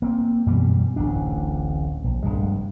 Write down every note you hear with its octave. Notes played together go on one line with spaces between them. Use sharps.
A#3 C4
F#2 B2 E3 G3
D1 A1 D4
A#1
F1 A#1 G2 G#3